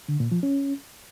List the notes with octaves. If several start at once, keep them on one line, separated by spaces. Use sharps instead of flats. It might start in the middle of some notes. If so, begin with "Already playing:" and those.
D3
A#2
F3
C#4